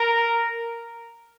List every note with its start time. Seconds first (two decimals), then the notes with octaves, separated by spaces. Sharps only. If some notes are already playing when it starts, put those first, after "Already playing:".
Already playing: A#4